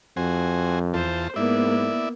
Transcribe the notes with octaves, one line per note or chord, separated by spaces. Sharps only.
F2 F#4 C5 G#5
E2 F4 C5 A5
G#2 A#3 B3 E4 D5 E5